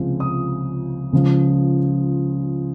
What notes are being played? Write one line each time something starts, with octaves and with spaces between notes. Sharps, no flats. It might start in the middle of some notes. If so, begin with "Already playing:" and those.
Already playing: C#2 C3 F3 G#3
D#6
C#2 C#3 F3